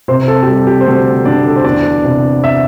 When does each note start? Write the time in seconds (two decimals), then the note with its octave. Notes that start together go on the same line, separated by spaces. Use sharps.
0.08 C3 C4 C5
0.28 A4
0.43 G4
0.47 G3 A4
0.67 G4
0.81 C5
0.86 D2 A4
1.25 D2 D4 D5
1.47 A4
1.56 C5
1.64 E2 D4 D5
2.04 C3
2.44 E5